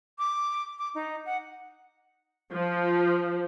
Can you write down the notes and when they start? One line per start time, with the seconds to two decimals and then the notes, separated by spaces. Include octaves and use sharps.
0.19 D6
0.78 D6
0.95 D#4
1.26 F#5
2.53 F3